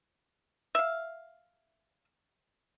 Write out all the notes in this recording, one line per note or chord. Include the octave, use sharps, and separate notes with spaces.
E5 F5